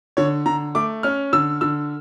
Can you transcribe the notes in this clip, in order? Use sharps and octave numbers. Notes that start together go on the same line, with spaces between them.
D3 C#5
D3 A#5
A3 D6
C#4 F6
D3 E6
D3 E6